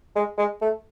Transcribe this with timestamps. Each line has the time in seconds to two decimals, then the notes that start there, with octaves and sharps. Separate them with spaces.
0.16 G#3
0.38 G#3
0.61 A3